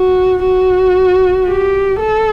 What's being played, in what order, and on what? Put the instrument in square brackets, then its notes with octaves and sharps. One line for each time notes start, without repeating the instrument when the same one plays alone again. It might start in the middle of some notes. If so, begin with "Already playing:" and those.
Already playing: [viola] F#4
F#4
G4
A4